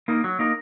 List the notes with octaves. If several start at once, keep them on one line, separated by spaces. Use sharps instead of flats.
A#3 D#4 A#4
F#3
A#3 D#4 A#4